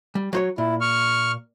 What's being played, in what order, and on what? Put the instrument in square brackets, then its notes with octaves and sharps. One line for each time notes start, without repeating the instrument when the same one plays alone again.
[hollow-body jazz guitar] G3
F#3 C5 C#5
[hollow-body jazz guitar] A#2 [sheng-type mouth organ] E4
[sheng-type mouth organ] C#6 F6